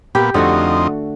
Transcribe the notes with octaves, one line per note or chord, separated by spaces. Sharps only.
A#2 B3 G4
F2 D3 A3 C4 D#4 F#4